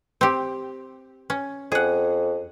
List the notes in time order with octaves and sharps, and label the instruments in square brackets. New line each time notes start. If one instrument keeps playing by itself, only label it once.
[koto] C4 G4
C#4
[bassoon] F2 [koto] G#4 F#5